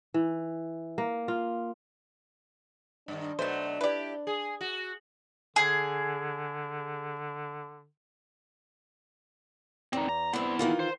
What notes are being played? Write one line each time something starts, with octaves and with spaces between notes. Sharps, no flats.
E3
A#3
F4
G2 D#3 D4
B2 F#3 A3 B3 C5
E4 G4 B4 D5
G#4
F#4
D3 G#4
E2 C4 D#4
A#5
G2 B3 C4 E4
D#3 E3 F4
C5